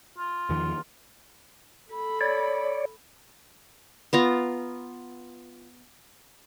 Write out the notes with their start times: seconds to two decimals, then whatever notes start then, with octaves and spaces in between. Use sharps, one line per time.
0.18 F4
0.49 E2 D#3 F3
1.91 A4 B5
2.21 C#5 D5
4.13 B3 F4 A#5